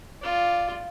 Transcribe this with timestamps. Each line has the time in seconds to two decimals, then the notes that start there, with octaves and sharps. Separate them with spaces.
0.21 F4 D5